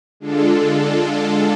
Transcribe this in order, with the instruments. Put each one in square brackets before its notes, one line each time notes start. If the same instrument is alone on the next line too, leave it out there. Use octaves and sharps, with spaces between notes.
[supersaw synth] D3 G#3 D4 F4 A4